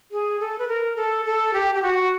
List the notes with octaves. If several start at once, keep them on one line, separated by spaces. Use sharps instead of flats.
G#4
A4
B4
A#4
A4
A4
G4
G4
F#4